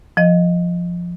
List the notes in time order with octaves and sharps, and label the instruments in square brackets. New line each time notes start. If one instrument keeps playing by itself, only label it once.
[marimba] F3 D#5